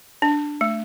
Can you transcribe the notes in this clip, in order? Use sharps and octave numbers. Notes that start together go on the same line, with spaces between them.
D4
A3